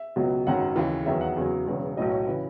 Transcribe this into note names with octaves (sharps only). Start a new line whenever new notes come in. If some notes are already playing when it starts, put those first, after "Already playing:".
Already playing: E5
C#2 B2 F#3
G#1 F#2 D#3 F#3 F#5
D#2 C#3 E3
E2 D#3 F#3 E5
F#5
E2 C#3 F#3
E1 E2 C#3 F#3
B1 A2 F#3 D#5
C#5
C#3 E3 B4